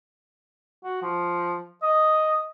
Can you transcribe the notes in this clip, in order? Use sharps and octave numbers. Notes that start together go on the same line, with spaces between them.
F#4
F3
D#5